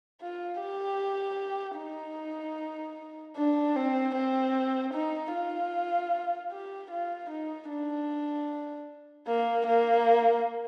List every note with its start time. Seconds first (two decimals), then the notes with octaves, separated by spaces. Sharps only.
0.21 F4
0.61 G4
1.78 D#4
3.37 D4
3.76 C4
4.15 C4
4.94 D#4
5.33 F4
6.52 G4
6.91 F4
7.30 D#4
7.70 D4
9.27 A#3
9.67 A#3